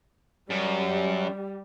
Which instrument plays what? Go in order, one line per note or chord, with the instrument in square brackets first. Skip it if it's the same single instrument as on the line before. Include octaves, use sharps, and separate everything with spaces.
[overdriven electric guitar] F#2 [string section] G3